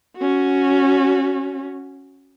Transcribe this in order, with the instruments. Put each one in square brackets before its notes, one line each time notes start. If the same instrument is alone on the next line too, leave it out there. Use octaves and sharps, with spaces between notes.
[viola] C#4 F#4